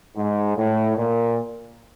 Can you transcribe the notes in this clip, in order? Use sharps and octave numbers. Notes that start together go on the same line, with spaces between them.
G#2
A2
A#2